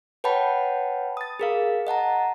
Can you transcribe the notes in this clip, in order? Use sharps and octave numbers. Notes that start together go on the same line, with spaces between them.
B4 C#5 F#5 G5 A5 B5
D#6 A6
G#4 A#4 F5
D#5 F#5 A5 A#5